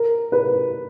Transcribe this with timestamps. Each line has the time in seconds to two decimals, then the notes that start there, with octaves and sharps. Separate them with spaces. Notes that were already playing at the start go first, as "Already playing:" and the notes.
Already playing: A#4
0.32 B4